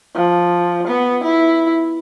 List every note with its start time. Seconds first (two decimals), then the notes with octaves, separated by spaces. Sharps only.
0.14 F3
0.88 B3
1.24 E4